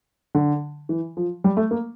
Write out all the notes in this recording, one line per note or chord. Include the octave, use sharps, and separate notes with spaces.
D3
E3
F3
G3
A3
A#3